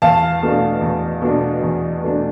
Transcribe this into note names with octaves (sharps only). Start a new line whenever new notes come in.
E2 F5 A5
B2 A3 D4
E2
B2 A3 D4
E2
B2 A3 D4